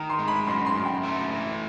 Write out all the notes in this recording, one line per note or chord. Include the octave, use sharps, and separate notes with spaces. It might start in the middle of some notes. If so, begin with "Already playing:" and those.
Already playing: D#3 A#5
C6
G#3
B5
F#2 C6
C6
F#2
G5
A3
E3